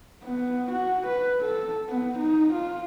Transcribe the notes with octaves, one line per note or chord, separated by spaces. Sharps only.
B3
F#4
B4
A4
B3
D#4
F4